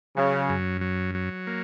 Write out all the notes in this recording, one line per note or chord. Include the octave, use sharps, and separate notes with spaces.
C#3 F#3
F#2
F#3
F#3
A#3